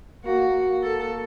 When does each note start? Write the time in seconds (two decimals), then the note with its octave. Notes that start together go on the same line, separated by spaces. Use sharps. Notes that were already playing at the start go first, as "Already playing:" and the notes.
0.25 A#3 F#4
0.54 A#3
0.83 A4